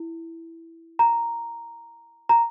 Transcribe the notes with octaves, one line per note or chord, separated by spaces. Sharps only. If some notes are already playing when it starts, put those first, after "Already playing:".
Already playing: E4
A#5
A#5